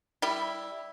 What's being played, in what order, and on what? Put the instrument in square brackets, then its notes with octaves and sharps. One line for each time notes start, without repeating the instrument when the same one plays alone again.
[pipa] G3 E4